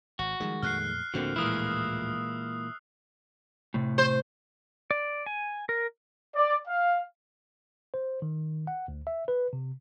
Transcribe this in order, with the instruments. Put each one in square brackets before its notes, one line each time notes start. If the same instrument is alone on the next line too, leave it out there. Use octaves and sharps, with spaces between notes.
[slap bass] G#1 [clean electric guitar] F#4
[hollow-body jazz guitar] D#3 G#3 [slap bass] F3 G3
[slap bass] F2 A#2 A3 [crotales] F6 F#6 C7
[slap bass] D2 A2 F3 [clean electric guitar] D3 [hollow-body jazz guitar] A#3 C4 F#4
[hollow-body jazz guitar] A#2 E3 [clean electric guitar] G#3 A#3 E4 [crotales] D#6 E6
[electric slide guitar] A2 C3
[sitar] C5
[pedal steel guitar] D5
G#5
A#4
[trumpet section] D5
F5
[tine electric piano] C5
D#3
F#5
D2
E5
B4
C3